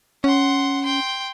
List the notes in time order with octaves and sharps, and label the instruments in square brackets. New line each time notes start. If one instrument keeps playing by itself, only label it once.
[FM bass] C#4 [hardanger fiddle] F#5 C6
[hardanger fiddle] G5 C6